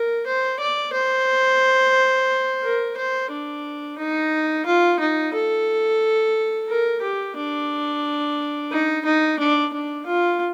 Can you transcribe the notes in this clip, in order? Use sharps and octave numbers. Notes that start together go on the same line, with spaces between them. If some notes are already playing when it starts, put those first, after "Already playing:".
Already playing: A#4
C5
D5
C5
A#4
C5
D4
D#4
F4
D#4
A4
A#4
G4
D4
D#4
D#4
D4
D4
F4